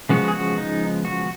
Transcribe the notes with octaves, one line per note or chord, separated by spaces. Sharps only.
C#3 F3 G#3 B3 F#4
G#4
F#4
D#4
F#4